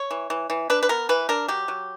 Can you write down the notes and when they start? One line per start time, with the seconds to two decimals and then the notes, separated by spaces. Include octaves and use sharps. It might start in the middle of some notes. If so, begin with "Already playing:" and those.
Already playing: C#5
0.11 E3
0.30 E3
0.50 E3
0.70 D4 B4
0.83 B4
0.89 B3 A#4
1.09 E3 B4
1.29 D4 A#4
1.48 F#3 G4
1.68 F#3